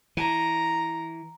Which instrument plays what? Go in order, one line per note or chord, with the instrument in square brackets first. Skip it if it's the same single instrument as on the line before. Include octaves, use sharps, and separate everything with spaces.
[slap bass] E3 [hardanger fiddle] A#5